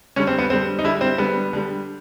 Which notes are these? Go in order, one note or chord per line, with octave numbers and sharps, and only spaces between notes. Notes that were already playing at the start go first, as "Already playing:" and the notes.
D3 G3 C#4
C4
B3
D3 G3 C4
D#4
D3 G3 E4
C4
D3 G3 B3
D3 G3